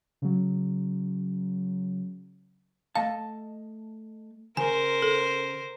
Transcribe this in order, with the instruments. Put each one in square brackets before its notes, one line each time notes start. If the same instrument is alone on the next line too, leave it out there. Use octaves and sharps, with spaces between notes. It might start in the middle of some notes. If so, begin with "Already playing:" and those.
[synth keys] C#3 F#3
[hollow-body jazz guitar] A3 D#5 A5 [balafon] F5
[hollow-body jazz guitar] C#3 C6 [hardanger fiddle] A#4 C5 [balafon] G#5
[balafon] A4